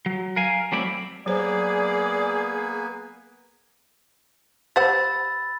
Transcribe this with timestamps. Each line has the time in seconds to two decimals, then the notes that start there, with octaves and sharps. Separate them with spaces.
0.06 F#3
0.36 A#4 F5 G#5
0.72 F#3 A3 C4 E4 D5
1.26 F#3 A#3 B3 G#4 C5 D5 G#5
4.76 G4 C5 F#5 B5 E6 A6